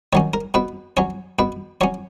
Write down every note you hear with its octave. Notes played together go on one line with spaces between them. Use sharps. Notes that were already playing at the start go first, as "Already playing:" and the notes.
D#3 F#3 C#4 C#5
A#4
B2 B4
F#3 C#4 C#5
B2 B4
F#3 C#4 C#5